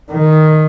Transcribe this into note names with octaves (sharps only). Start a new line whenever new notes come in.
D#3